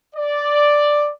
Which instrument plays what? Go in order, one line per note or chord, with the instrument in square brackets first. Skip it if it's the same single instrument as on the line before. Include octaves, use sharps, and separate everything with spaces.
[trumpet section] D5